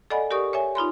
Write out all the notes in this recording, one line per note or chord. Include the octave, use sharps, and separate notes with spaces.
A4 D5 D#5 F#5 G#5 B5
G4 A#4 D5 C#6 D#6
C#5 E5 G#5
D#4 F4 B5 C6